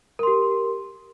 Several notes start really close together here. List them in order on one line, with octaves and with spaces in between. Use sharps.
A#4 C6 G4